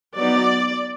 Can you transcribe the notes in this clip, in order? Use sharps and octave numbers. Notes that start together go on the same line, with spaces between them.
F#3 B3 D#4 D5